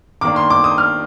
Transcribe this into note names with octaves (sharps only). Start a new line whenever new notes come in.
D#3 A#3 D4 D6
C6
D6
D#6
F6